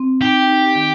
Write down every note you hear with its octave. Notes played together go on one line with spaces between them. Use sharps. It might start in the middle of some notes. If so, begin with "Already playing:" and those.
Already playing: C4
D#4 G4
D#4
D#3